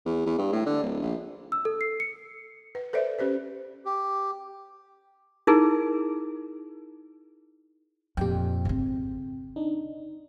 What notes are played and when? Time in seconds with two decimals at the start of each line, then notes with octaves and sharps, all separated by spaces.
0.06 E2
0.26 E2
0.38 G2
0.52 A2
0.66 D3
0.83 D1
1.02 A#1
1.52 E6
1.65 A4
1.81 C7
2.00 C#7
2.75 B4
2.93 A4 B4 C5 D5 E5
3.19 C#4 G4 B4 C5
3.85 G4
5.47 D#4 E4 G#4 A#4
8.17 F2 A#2 G4 G5
8.65 G#1 C#3 C4
9.56 D4 D#4